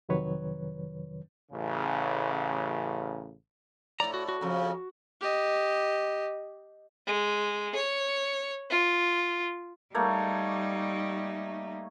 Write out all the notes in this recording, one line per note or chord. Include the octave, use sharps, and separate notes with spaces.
F2 C3 D#3 F#3 B4 C#5
A1 C#3
A2 D5 A#5
F#4
F#4
F2 C#3
G4 D#5
G#3
C#5
F4
G3 A3 A#3 D#4 C#5